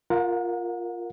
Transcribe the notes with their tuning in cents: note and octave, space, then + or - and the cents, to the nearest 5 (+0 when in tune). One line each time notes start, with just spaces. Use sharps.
F4 +0 A#4 +0 F#5 -40